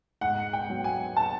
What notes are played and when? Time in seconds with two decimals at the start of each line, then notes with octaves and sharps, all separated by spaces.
0.21 G#2 F#5
0.53 G5
0.70 F#3
0.84 G#5
1.16 A5